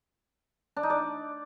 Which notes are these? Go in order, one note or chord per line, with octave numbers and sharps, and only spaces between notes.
D4
D#4
D5